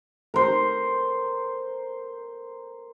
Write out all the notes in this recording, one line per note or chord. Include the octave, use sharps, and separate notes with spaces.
A#4 C5